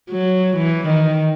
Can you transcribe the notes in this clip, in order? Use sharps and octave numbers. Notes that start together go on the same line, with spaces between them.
F#3
E3
D#3